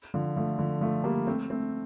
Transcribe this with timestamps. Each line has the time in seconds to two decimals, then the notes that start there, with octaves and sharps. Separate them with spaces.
0.14 D3 F3
0.36 F3 A3
0.59 D3 F3
0.81 F3 A3
1.04 G3 A#3
1.27 A3 C4
1.50 A3 C4